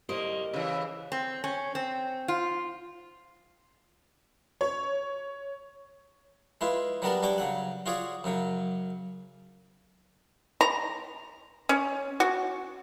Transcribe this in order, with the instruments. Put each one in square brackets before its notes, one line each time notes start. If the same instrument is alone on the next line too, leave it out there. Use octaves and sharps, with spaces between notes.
[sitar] A#3 [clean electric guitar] G4 A#4 C5 [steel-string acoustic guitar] D#5
[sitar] C#3 E3
[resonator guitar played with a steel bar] C4
C#4
C4
F4
[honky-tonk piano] C#5
[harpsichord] G#3 E4 F4 B4
F#3 G3 B3 D4 A#4 A5
G3 D4 C#5 G5 D6
C#3 F#3 F#5
F4 F#4 G#4 C#5 D5
F#2 C#3 F#3
[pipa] A#5
C#4
F#4